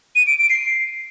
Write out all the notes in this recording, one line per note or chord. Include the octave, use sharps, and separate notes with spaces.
D#7
D7
D7
C7